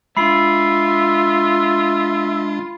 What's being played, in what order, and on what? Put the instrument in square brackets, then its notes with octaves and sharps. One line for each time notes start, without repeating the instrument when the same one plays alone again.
[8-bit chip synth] G#3 D4 [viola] F4 [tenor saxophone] E5 [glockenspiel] B5 C7